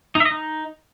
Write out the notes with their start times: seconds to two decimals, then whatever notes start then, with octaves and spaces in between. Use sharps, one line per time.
0.15 D#4
0.20 E5
0.25 D#5
0.31 D#4